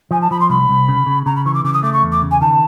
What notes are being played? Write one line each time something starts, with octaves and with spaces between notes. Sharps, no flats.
F3 G#5
A5
F3 B5
C6
C2 B5
C2
C#3
C#3
C#3 A#5
B5
E3 C#6
D6
C#3 D6
D#6
A3 D6
C#6
E2
D6
C#3
G#5
D#3 A5